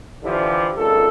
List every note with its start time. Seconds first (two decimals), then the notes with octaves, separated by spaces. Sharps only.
0.24 D3 E3 F3 E4 G4
0.77 G#1 C#2 A#2 A4